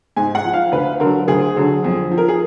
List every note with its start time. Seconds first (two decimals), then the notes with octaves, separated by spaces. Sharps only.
0.16 G#2 G#5
0.35 F#5
0.45 F3
0.53 F5
0.72 D2 B4
1.00 D3 F#3 A#4
1.28 D2 G#4
1.56 D3 F#3
1.84 F2
2.11 F3
2.18 A#4
2.28 G#4